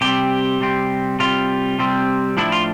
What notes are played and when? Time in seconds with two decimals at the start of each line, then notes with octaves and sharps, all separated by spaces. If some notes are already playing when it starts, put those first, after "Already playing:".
0.01 C3 G3 C4 G4
0.61 C3 G3 C4
1.19 C3 G3 C4 F4
1.79 C3 G3 C4
2.37 A2 F3 A3 D4 E4
2.52 F4